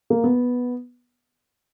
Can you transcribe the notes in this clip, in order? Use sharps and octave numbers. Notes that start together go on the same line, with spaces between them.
A#3
B3